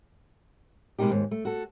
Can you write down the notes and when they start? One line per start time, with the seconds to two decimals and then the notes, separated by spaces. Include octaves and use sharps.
0.99 B2 G#3 A#3 D#4 G4
1.10 D#2 G#2
1.31 A3
1.45 F#4 A4